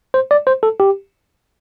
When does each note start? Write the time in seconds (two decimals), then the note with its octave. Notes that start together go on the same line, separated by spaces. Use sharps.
0.14 C5
0.31 D5
0.47 C5
0.63 A4
0.80 G4